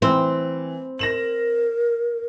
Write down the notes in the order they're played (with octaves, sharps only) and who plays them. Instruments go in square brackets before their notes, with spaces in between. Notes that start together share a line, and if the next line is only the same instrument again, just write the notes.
[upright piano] E3 [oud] C4
[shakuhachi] A#4 [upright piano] A#6 E7 F#7